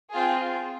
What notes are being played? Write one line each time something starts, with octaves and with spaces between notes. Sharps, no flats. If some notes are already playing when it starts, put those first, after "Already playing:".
C4 F4 G#4